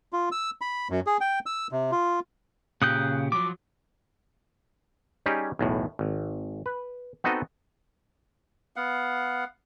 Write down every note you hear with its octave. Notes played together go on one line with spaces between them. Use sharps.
F4
E6
B5
F#2
G#4
G5
E6
C3
F4
A#2 C#3 G4 D#6 F#6 G6
F3 F#3 D6
G3 C#4 D#4 G4 G#4
B1 E2 A2
G#1
B4
B3 C4 D#4 F#4 A4 D#5
B3 F5 F#5